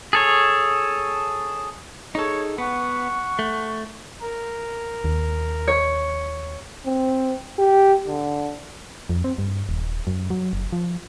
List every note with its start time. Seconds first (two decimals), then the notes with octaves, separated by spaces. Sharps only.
0.13 G#4 A4 C#5
2.15 D#4 G#4 A4 C#5
2.58 B3 F#5 C#6
3.39 A3
4.21 A#4
5.04 D#2
5.68 C#5
6.86 C4
7.59 G4
8.08 D3
9.10 F2
9.24 C4
9.38 G2
9.69 D#1
10.07 F#2
10.30 F#3
10.53 F#1
10.73 F3